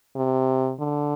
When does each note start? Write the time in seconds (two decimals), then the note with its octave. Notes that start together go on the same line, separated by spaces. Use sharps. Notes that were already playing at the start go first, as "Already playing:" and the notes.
0.16 C3
0.79 D3